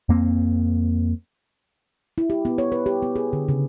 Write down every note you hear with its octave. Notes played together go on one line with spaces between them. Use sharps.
F2 A#3 C4
E4
G4
B3
C#5
B4
G4
B3
G#4
D3
C#3